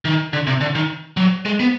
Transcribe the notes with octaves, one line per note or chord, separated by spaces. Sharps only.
D#3
D3
C3
D3
D#3
F#3
G#3
B3